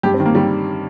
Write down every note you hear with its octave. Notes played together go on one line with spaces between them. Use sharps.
G2 G4
C4
D#3
A#3
D#3 G3